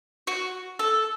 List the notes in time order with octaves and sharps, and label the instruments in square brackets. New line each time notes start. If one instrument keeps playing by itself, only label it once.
[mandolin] F#4
A4